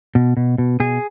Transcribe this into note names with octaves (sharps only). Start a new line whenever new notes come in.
B2
B2
B2
B2 G#4